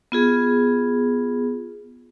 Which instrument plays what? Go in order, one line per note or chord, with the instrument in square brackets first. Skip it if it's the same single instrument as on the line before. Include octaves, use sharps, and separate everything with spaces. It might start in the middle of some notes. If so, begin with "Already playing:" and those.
[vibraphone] B3 F4 G#4